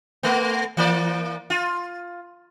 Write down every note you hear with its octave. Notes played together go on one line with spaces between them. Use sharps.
A3 B3
E3 A#3 D5
F4